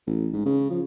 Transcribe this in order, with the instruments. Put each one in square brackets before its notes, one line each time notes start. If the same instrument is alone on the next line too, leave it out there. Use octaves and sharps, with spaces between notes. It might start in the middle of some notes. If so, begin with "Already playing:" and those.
[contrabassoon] A1
G#2
C#3
F3